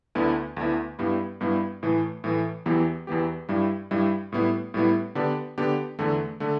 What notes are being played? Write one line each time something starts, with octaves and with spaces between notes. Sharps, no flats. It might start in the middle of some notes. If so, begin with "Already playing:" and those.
D2 D3 B3 E4
D2 D3 B3 E4
G2 G3 B3 E4
G2 G3 B3 E4
A2 E3 A3
A2 E3 A3
E2 E3 B3 G4
E2 E3 B3 G4
G2 G3 E4
G2 G3 E4
A2 G3 B3 E4
A2 G3 B3 E4
D3 B3 D4 G4
D3 B3 D4 G4
E2 D3 A3
D3 A3